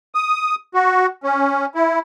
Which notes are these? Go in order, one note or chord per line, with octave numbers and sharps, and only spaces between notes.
D#6
F#4
C#4
E4